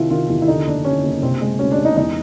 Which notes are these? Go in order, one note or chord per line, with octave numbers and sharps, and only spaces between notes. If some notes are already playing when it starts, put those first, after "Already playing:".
Already playing: C2 C3 D#3 E4 F4
D#3 F4
E2
E4
D3 D#4
F#1 D4
D3 C#4
F#1
C3 C4
G#3
D2 C#4
D4
G#3
D#4
E2 D#4